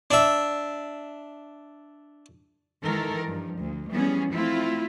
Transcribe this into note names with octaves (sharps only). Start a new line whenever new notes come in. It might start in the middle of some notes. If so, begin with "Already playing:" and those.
D4 E5
D#3 E3 G#3 A4 A#4
G2 F3
D2
E3 F3 G3 B3 C#4 G#4
A3 C4 E4 F4